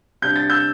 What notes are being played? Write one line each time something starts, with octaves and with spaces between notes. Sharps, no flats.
C3 G3 D4 G6
A6
E6 G6